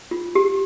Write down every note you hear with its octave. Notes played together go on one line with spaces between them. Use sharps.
F4
G4